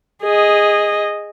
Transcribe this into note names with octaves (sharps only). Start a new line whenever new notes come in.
G#4 D#5